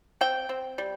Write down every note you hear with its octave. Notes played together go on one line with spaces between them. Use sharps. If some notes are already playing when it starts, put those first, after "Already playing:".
C4 G5
C4
G3